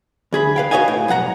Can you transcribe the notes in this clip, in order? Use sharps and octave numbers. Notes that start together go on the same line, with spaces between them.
D2 G#4 B5
B4 F5 G5
F#4 B4 C#5 D#5 F5 G#5
A2
B1 F2 F#5 A#5